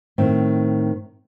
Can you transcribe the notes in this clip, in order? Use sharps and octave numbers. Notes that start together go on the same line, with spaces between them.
A2 D#3 C4